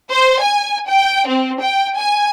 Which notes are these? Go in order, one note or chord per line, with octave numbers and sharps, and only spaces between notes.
C5
G#5
G5
C4
G5
G#5